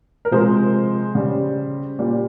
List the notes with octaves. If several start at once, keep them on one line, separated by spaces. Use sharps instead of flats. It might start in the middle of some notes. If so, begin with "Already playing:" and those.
A#4
C3 F3 G#3 C5
C#3 G3
A#2 G3